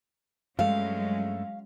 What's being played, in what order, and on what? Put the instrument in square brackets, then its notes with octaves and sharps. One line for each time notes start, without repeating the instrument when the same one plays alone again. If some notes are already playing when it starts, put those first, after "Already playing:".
[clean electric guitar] G2 A3 [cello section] F#3 G#3 C#4 [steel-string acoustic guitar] F5